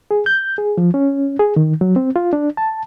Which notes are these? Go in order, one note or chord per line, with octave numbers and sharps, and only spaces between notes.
G#4
G6
G#4
F3
C#4
G#4
D#3
F#3
C4
F4
D4
A5